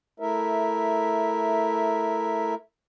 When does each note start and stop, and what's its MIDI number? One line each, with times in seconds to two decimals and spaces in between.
0.20 2.54 57
0.20 2.54 64
0.20 2.54 70
0.20 2.54 76